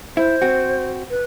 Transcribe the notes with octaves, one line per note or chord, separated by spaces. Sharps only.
E4 C5
C4 F#4
B4